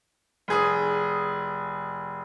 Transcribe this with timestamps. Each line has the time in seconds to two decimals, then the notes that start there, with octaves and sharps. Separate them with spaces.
0.48 F1 G#4 D#6